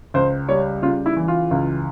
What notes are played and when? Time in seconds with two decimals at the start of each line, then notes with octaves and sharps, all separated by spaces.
0.14 C#2 C5
0.49 G3 C#5
0.82 C#3 F4
1.06 E4
1.17 E3
1.28 F4
1.51 C#2